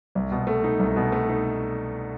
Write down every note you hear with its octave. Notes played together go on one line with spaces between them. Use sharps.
C2
B2
A3
D#4
C2
B2
A3
D#4